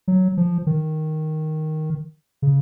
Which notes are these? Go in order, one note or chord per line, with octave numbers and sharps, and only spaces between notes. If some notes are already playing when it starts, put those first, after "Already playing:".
F#3
F3
D#3
C#3